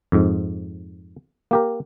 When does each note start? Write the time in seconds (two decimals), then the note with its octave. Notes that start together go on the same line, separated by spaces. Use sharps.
0.12 F2 G#2
1.51 A#3 G4 A#4